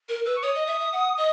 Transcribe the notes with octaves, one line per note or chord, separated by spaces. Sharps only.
A#4
B4 E6
C#6
C#5 D#6
D#5
E5
E5
F#5
D#5